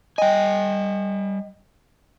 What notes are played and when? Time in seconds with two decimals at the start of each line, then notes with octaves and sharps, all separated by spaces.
0.18 G3 D#5 G5 G#5